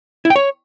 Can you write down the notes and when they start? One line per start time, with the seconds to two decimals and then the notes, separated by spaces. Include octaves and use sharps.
0.25 E4
0.30 G5
0.36 C#5